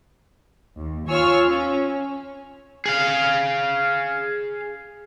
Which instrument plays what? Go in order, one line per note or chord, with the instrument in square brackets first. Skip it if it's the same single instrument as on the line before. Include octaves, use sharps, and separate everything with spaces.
[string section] D#2
F4 C#5 G#5 C#6 E6 F6
C#4
[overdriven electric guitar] G#4 F5